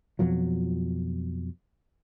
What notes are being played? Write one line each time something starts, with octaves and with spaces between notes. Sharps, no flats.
F2 B2 F3 F#3